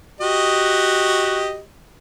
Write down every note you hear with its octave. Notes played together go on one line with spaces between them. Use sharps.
F#4 G4 D#5